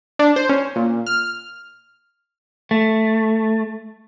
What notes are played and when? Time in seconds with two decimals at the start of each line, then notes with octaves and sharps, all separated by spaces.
0.19 D4
0.36 C5
0.49 C#4
0.76 A#2
1.07 F6
2.71 A3